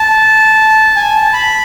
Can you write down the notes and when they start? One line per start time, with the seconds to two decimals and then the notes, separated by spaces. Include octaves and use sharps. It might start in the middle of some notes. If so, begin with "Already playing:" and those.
Already playing: A5
0.96 G#5
1.15 A5
1.33 B5